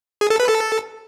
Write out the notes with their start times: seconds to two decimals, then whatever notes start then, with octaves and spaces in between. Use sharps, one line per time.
0.21 G#4
0.30 A4
0.40 B4
0.49 A4